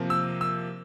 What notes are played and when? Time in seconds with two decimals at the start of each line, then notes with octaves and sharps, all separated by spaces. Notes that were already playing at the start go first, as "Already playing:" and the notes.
Already playing: C3 F3 A#3
0.10 E6
0.41 E6